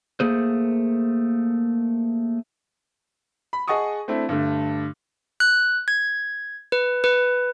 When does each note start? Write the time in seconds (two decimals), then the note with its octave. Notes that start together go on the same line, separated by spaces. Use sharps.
0.20 A3 A#3 G#4 C5
3.53 B5
3.68 G#4 D#5 F#5 A5 C#6 D#6
4.08 A3 C4 D4 E4
4.29 G2 D3 A3
5.40 F#6
5.88 G#6
6.72 B4
7.04 B4